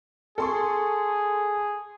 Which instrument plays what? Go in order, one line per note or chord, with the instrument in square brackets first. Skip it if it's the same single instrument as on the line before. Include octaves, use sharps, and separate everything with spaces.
[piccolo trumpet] G#4 [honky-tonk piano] A4 C6 C#6